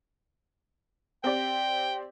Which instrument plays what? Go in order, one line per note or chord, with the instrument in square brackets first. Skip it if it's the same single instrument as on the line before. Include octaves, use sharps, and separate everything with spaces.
[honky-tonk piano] C4 G4 D5 [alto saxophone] G5